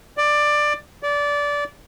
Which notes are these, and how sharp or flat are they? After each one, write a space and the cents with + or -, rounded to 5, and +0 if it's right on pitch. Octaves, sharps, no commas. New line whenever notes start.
D5 +15
D5 -20